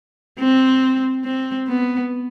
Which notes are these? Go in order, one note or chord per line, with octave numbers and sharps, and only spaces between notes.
C4
C4
B3